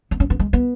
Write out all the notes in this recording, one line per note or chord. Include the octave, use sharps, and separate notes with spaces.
B3
C#4
B3
G#3
B3